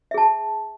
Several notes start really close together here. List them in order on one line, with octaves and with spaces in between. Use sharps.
E5 G#4 A5